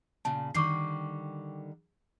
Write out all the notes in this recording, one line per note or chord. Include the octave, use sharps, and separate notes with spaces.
A#2 C#3 A5
D3 D#3 G3 C#6 D6 C7